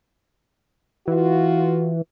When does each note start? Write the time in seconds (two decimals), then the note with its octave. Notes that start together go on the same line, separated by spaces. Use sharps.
1.08 E3 F4 F#4